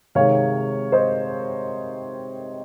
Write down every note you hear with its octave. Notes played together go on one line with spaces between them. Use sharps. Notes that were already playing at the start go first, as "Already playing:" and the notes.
C3 D#3 G#3 C#5 F5
C5 D#5